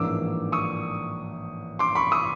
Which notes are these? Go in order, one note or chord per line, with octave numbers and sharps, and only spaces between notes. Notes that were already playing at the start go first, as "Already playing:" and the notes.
Already playing: A1 G#2 F3 A#3 D4 D6 E6
C#6 D#6
C6 D6
B5 C#6
C#6 D#6